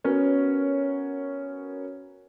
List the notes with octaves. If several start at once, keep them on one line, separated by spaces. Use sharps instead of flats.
B3 C#4 F#4 A#4 C#5